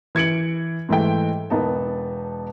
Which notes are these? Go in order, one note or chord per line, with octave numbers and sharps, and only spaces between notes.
E3 G#6 C#7 D7 F#7
G#2 E3 A3 G5
E1 B3 D#4 A5